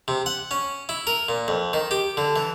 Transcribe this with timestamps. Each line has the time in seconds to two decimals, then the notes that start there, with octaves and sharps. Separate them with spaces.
0.08 C3
0.26 F#5
0.51 C#4
0.89 E4
1.07 A#4
1.29 A#2
1.48 F2
1.73 D#3
1.91 G4
2.17 D3
2.36 E3